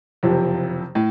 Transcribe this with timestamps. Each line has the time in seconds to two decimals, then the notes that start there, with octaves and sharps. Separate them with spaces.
0.23 F#1 F2 C3 F3
0.95 A2